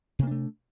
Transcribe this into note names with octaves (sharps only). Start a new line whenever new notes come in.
C3 A3 A#3 D4